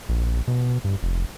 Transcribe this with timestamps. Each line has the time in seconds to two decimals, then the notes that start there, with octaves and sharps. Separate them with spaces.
0.09 A#1
0.48 B2
0.84 G2
1.03 F1